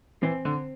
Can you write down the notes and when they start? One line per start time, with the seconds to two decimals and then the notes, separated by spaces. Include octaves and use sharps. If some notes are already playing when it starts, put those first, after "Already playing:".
0.23 E3 C4
0.45 D3